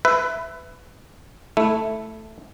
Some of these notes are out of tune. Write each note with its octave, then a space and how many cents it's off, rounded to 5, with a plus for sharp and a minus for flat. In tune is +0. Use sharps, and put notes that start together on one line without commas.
B4 +15 E5 +5
A3 +0 E4 +0